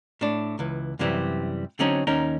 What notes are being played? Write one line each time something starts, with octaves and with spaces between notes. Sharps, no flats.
A2 D4
C#2 E3
F#2 C3 E3 G3 C4
D3 F#3 C4 C#4 D#4
D#2 C#4 D#4 A#4